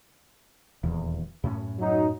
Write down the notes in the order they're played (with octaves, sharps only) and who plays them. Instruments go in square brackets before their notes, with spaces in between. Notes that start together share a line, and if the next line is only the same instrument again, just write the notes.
[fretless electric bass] D#1 E2
F#2 A2 C#4
[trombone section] F#3 D#4